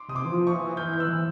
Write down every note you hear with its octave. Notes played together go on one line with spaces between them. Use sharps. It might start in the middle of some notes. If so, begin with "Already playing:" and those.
Already playing: C6 D6
C3 D#6
C6 D6
E3
F3
C#6 D#6
E3
E3 F6 G6
G6
E6 F#6
E3